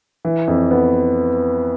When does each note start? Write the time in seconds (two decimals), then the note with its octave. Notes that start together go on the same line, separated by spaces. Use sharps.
0.25 E3
0.48 F2
0.71 B3